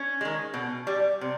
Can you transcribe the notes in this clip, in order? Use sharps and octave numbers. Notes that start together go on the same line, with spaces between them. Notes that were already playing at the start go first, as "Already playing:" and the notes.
Already playing: C#4
D#3 G#3
B2
G3
C3